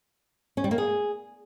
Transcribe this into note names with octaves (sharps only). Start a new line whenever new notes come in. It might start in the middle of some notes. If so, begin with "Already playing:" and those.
C#4
G3
A#3
G#4